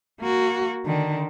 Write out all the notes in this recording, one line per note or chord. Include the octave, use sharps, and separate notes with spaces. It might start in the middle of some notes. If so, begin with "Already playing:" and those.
A#3 F#4
D3 D#3